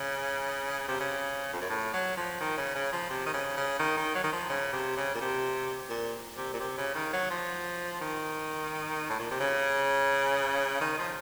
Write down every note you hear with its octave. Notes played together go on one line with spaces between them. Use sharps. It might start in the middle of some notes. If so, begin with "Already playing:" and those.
Already playing: C#3
C3
C#3
F2
F#2
A2
F#3
F3
D#3
C#3
C#3
F3
C3
D#3
C#3
C#3
D#3
D#3
F#3
D#3
F3
C#3
C3
C#3
A#2
C3
A#2
C3
A#2
C3
C#3
D#3
F#3
F3
D#3
A2
A#2
C3
C#3
D#3
F3